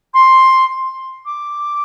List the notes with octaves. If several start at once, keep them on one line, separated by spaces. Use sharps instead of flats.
C6
D6